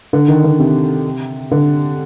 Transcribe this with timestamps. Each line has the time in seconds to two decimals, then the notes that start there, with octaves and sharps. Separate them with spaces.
0.13 D3
0.28 D#3
0.44 D3
0.59 C3
1.51 D3